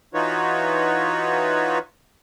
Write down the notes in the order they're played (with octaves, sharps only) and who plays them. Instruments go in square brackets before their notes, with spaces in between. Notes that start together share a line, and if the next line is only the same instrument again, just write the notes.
[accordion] E3 D#4 F4 F#4 B4 C#5